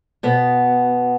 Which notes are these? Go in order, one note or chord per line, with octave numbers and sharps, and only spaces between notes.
B2 B3